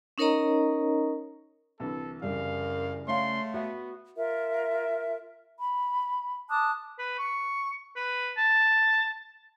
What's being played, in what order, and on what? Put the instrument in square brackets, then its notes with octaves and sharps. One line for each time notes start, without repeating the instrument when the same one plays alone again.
[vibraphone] C#4 D#4 A#4 C#5 D#5 A#5
[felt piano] C2 D3 E3 [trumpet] A4
[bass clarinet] F#2 [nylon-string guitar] C#3 G3 [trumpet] F5
[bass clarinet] A3 [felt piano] C#5 F5 [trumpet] C6
[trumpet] B3 [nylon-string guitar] F#4 E5 F#5
[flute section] F4 A#4 E5
B5
A5 D6 D#6 F#6
[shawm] B4
C#6
B4
A5